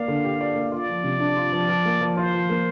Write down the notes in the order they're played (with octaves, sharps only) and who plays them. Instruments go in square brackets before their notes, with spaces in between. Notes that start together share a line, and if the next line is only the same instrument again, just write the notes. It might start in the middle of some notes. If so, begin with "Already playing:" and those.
Already playing: [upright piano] A#3 D5 [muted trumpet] F5
[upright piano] D3
G4
D5
A#3
[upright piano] F4 [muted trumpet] D5
[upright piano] F3
C3
D4
F4
F3
F3
A#3
F3
[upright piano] F4 [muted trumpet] C5
[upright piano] F3
A#3